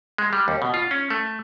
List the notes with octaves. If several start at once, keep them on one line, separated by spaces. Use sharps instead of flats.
G#3
G3
D#2
B2
F4
C#4
A3